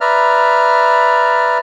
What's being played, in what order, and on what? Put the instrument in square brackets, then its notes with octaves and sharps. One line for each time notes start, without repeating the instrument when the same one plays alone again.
[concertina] B4 D5 E5 A#5 F6